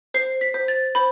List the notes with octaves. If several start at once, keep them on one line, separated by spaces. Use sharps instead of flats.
C5 C7
B6
C5
A6
C5 B5